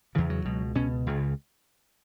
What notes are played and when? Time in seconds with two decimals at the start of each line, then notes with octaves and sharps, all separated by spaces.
0.15 E2 C#3 E3
0.30 F#3
0.45 C#2 B2
0.75 C#2 B2 C#4
1.07 C#2 C#3